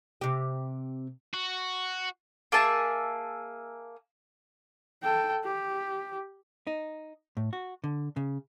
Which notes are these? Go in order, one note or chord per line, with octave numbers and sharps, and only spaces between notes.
C3 G4
F#4
A#3 G#4 E5 A5
A4 G5
G4
D#4
A2
F#4
D3
C#3